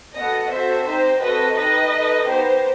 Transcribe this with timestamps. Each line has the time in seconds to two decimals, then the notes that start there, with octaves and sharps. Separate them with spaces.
0.16 B3 F#4 A4 D#5 F#5
0.51 C4 F#4 A4 C5 E5
0.86 C4 D#4 G4 C5
1.21 C4 F#4 A4 B4 D#5
1.56 D#4 G4 B4 D#5
1.92 D#4 A4
2.27 B3 D#4 G4 C5